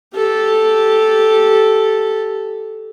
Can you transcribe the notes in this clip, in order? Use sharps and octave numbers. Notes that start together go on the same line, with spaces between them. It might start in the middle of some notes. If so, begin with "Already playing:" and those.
G4 A4